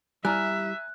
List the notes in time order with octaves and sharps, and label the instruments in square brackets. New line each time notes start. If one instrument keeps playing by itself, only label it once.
[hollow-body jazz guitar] G3 E4 [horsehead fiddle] E5 [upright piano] G#5 A#5 F6 [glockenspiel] F#6